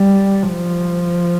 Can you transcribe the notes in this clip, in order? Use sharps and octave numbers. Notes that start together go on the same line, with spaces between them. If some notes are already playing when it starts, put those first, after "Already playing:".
Already playing: G3
F3